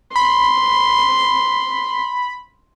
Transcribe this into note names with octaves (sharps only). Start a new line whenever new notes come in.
B5 C6